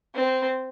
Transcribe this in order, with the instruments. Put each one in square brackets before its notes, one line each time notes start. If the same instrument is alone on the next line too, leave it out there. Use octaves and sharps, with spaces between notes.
[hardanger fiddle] C4